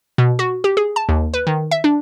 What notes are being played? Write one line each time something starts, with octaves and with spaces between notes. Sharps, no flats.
B2
F#4
G4
G#4
A5
D#2
B4
D#3
E5
D4